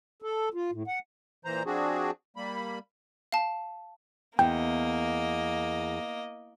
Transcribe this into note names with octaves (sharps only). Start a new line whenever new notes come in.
A4
F4
A2
F#5
A#2 E3 C5 A#5
F3 C4 D4 F#4 G#4
G3 A#3 B5
F5 A5
E2 A#3 D#5 G5